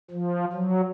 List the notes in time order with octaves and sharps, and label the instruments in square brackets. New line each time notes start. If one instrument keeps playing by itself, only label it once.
[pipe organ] F3
F#3